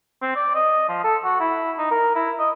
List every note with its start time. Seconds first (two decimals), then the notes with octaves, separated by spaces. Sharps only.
0.22 C4
0.36 D5
0.55 D#5
0.89 F3
1.04 A4
1.25 F#4
1.40 E4
1.78 D#4
1.91 A#4
2.15 E4
2.39 D#5